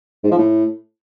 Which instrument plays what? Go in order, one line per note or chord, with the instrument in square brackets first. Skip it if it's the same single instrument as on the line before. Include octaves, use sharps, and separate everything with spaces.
[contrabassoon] G#2
F3
A2